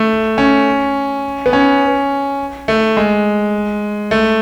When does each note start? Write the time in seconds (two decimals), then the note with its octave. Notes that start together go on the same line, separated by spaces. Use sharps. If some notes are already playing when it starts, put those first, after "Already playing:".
Already playing: A3
0.38 C#4
1.46 B3
1.53 C#4
2.68 A3
2.97 G#3
4.11 A3